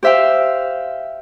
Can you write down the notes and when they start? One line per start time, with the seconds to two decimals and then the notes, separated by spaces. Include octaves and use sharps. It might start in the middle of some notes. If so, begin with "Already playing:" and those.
0.03 G4 C5 E5 F5 G5